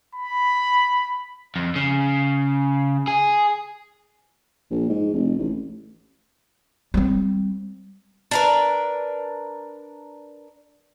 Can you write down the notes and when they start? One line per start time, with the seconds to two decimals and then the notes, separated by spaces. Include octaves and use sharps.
0.15 B5
1.56 F2
1.76 C#3
3.08 G#4
4.71 A#1
4.89 G#2
5.13 F1
5.38 A1
6.94 G3 C4
8.31 D4 A#4 B4